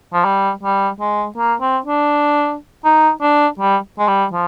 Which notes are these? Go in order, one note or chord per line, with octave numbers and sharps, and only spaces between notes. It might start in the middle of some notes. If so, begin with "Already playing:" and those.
F3
G3
G3
G#3
A#3
C4
D4
D#4
D4
G3
G#3
G3
F3